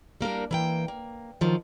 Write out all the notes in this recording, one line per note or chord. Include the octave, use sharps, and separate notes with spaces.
G3 A#3 D4 A#4
E3 A#3 G5
A#3
D#3 F3 F#3